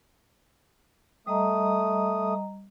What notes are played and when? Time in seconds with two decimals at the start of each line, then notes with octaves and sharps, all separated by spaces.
1.27 G3 A3 D#5 A#5 D#6